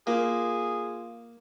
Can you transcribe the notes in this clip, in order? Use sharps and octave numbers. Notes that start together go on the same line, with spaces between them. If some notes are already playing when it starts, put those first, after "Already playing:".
A#3 F4 G#4 F5